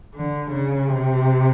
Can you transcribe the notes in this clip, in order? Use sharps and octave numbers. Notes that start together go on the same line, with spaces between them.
D3
C#3
C3